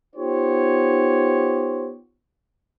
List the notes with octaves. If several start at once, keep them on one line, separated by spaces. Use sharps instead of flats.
B3 D#4 F4 G4 C5 C#5